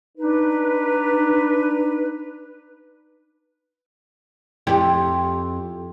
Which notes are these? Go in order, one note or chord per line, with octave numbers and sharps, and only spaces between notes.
D4 D#4 B4
F2 E4 G4